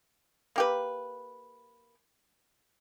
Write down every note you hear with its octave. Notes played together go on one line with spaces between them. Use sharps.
A#3 G4 B4